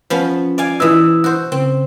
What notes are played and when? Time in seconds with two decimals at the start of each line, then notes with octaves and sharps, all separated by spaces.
0.10 F3 B3 C#4
0.58 D5 F5 G#5
0.80 B2 E3 E4 D#6 E6
1.24 F#4 C5
1.52 C#3 C4